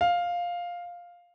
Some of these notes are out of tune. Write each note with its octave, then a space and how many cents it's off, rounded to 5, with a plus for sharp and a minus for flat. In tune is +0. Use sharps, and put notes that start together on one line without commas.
F5 +5